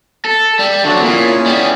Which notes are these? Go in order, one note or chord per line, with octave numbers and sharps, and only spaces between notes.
A4
G3
D3 F#3 C4 D4 F#4
A#2 C#4 E4 G#4
G3 B3